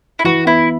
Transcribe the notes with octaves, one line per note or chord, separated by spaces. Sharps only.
E4
E3 F#4
B3 E4